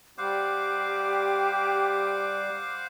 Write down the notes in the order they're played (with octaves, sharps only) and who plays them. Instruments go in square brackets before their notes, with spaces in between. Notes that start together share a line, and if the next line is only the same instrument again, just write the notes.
[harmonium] G3 [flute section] G4 [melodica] C5 F5 F#5 [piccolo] D6